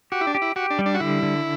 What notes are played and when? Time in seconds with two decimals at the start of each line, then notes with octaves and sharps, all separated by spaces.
0.12 F#4 G4
0.21 E4
0.27 D4
0.35 G4
0.42 E4
0.56 F#4 G4
0.70 D4
0.79 G3
0.86 D4
0.95 F#4
1.00 D3 E4
1.23 D3